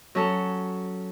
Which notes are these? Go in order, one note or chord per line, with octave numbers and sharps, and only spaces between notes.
F#3 C#4 A4